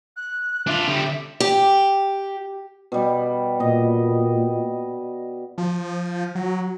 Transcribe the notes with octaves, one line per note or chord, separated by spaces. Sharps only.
F#6
D4 F4 E5
D3 G3
G4
B2 G3
A#2 D#5
F3
F#3